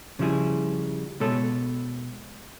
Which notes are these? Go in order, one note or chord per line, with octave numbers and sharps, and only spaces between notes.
C#3 F3 G3 E4 G#4
B2 G#3 A4 C#5 A5